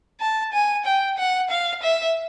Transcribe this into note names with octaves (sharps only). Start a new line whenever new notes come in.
A5
G#5
G5
F#5
F5
E5